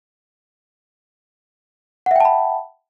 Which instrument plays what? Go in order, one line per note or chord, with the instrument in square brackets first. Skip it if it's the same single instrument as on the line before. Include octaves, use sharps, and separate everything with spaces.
[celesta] F#5
E5
G5
A5
B5